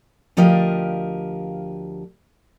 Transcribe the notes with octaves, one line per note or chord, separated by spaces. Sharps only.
D2 F3 G4 A#4 D#5 F5